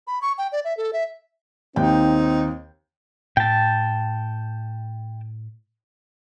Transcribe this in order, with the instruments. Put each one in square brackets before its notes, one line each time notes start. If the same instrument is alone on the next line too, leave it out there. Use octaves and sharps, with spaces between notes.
[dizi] B5
C#6
G5
D5
E5
A4
E5
[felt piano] D#2 G5 [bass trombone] C4 [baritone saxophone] D#4
[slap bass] A2 [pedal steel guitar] G5 A5